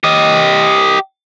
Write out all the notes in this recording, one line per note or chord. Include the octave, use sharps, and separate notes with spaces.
G4 D#5